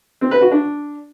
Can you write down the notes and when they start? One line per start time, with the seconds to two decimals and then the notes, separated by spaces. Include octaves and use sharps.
0.21 C4
0.31 B4
0.41 F#4
0.51 D4